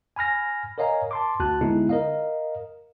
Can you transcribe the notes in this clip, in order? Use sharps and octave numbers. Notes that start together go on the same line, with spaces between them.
G#5 B5 F6 A#6
A#4 C#5 D#5 F5 G#5 A#5
A5 C6 D6
D2 F#4 A5 F#6
D3 G#3 B3 D#4 E4 G#4
A#4 D#5 F5